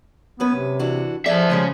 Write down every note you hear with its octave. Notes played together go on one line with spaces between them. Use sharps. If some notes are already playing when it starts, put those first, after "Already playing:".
F#2 B3 C#4 B4
C3
E3 D4 F#4
F3 G#4 A4 D5 E5
C#3 G3 G#3 F4